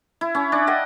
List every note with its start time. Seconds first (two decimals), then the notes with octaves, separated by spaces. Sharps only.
0.21 E4
0.35 C#4
0.52 D4
0.67 D#5 F#5 G5